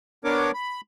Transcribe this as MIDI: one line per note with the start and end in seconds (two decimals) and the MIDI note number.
0.24 0.51 59
0.24 0.51 62
0.24 0.51 70
0.24 0.51 73
0.24 0.51 86
0.54 0.81 83